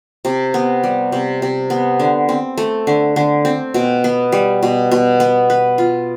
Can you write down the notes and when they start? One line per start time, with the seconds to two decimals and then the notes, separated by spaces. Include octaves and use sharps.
0.25 C3
0.54 B3
0.83 G3
1.12 C3
1.42 C3
1.70 B3
2.00 D3
2.29 C4
2.58 A3
2.87 D3
3.16 D3
3.45 C4
3.74 B2
4.04 B3
4.32 G3
4.63 B2
4.91 B2
5.20 B3
5.50 B4
5.78 F4